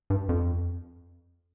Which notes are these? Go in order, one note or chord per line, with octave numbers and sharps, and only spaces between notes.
G2
F2